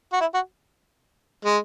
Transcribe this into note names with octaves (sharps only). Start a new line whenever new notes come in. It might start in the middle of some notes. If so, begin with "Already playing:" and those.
F#4
E4
F#4
G#3